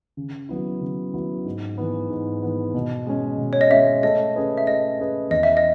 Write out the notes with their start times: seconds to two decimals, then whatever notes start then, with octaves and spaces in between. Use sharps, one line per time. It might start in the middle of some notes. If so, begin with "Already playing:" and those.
0.17 C#3
0.49 F#3 B3 E4
0.81 C#3
1.13 F#3 B3 E4
1.45 G#2
1.78 E3 B3
2.10 G#2
2.42 E3 B3
2.74 B2
3.07 G#3 C#4
3.38 B2
3.53 C#5
3.61 D#5
3.70 G#3 C#4 E5
4.03 A3 D#5
4.36 C#4 G#4 B4
4.58 E5
4.67 A3 D#5
4.99 C#4 G#4 B4
5.31 E2 D#5
5.43 E5
5.57 D#5